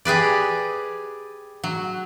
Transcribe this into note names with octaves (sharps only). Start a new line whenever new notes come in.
G4 G#4 B4 D5
F#3